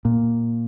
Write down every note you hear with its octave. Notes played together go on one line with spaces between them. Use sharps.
A#2